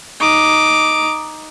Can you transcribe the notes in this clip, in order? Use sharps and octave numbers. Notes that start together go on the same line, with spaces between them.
D#4 D6